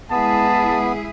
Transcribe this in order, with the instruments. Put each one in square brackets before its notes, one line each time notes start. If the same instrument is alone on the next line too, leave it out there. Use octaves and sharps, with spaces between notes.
[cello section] G#3 E4 G#4 [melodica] B3 [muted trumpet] A5